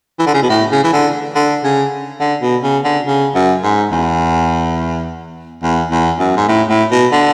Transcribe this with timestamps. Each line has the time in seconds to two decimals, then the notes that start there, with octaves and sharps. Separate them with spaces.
0.19 E3
0.27 D3
0.34 C#3
0.43 B2
0.50 A2
0.72 C#3
0.84 E3
0.93 D3
1.35 D3
1.64 C#3
2.20 D3
2.42 B2
2.63 C#3
2.84 D3
3.07 C#3
3.35 F#2
3.64 G#2
3.92 E2
5.63 E2
5.91 E2
6.19 F#2
6.37 G#2
6.48 A2
6.69 A2
6.92 B2
7.13 D3